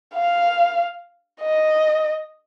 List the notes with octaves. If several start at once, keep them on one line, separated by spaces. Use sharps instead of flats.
F5
D#5